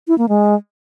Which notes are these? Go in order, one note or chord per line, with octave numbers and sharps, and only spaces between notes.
E4
A#3
G#3